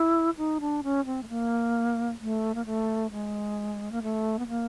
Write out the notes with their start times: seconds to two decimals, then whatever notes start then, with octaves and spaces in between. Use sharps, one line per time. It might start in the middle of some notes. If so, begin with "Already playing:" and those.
Already playing: E4
0.38 D#4
0.60 D4
0.83 C#4
1.05 C4
1.23 A3
1.29 A#3
2.20 A3
2.55 A#3
2.66 A3
3.12 G#3
3.92 A#3
4.02 A3
4.39 B3
4.48 A#3